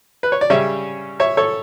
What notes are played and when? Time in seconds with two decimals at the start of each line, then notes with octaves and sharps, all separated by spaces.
0.23 B4
0.32 C#5
0.41 D5
0.50 C#3 G3 C#4 C#5 E5
1.20 C#5 E5
1.37 A4 C#5